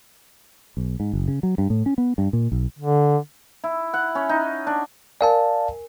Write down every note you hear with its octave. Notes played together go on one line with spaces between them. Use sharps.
B1
G#2
F#1
C#3
F#3
G2
A2
C#4
B3
G2
A#2
B1
D3
E4
F#5
C#4
D#4
D4
A#4 D5 F5 G#5 A5